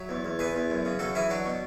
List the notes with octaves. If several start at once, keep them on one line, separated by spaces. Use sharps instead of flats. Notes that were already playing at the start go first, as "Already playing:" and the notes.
Already playing: F#3 E5
E2
E2
E2 G#4 B4
E2
F#2
C#3
F#2 F#4 A4
E3 E4 G#4
F#3 D4 F#4
B2